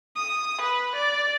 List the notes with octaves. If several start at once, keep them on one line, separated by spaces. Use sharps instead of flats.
D#6
B4
D5